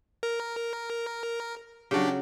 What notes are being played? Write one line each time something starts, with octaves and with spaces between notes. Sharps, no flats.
A#4
C#3 F#3 D4 G4